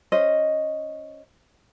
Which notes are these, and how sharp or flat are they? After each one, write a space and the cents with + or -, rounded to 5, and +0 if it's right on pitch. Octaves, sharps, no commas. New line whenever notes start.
C#4 +0 C5 +0 D#5 +0